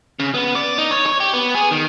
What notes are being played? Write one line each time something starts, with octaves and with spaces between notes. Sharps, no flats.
C#3
B3
D5
D#4
C#5
C#5
G4
B3
G#4
D#3